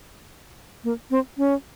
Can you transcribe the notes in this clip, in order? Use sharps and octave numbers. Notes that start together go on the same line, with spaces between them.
A#3
C4
C#4